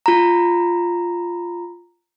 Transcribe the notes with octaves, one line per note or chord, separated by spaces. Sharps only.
F4 A#5